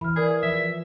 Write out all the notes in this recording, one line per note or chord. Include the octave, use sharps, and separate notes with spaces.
E3 B5 F6
G#4 A#4 D5
F3 E5